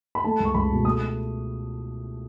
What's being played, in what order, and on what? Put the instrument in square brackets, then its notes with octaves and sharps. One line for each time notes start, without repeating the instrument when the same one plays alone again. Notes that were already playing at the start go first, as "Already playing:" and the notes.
[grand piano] B5
A3 A5
C#2
C#6
C#2 B5
B2
A3 D#6